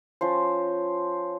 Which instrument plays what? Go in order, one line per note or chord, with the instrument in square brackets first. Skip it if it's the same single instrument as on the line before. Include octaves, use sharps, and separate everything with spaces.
[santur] F3 C#4 C5